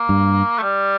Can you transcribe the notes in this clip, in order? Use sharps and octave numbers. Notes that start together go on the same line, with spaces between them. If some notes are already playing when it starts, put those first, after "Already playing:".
Already playing: A#3
G2
A3
G3